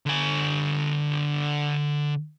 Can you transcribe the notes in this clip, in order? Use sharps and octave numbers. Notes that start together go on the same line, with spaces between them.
D3 G#5